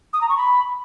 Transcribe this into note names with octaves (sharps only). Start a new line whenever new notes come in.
D#6
A#5
C#6
B5